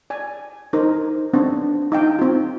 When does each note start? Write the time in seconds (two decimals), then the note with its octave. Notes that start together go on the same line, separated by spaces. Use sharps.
0.10 D5 G#5
0.73 D#4 A#4 C5
1.33 B3 C4 D4
1.92 D#4 F5 G5
2.19 C4 F4